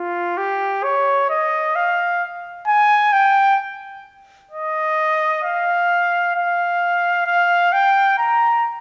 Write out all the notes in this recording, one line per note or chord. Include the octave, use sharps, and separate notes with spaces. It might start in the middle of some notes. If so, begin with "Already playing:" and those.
Already playing: F4
G4
C#5
D#5
F5
G#5
G5
D#5
F5
F5
F5
G5
A#5